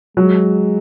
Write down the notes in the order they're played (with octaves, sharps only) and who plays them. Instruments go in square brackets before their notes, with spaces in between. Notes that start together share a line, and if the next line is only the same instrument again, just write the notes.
[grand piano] F#3 [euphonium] G#3